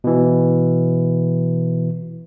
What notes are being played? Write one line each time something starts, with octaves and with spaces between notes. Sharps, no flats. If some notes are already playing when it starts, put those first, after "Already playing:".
B2 E3